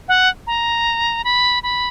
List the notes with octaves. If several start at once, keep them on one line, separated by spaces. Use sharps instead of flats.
F#5
A#5
B5
B5